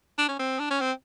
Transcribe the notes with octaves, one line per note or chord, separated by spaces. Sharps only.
D4
C#4
C4
D4
C#4
C4